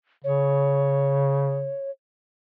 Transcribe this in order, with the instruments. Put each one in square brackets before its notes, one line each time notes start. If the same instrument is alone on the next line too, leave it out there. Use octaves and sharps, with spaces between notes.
[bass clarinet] C#3 [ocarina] C#5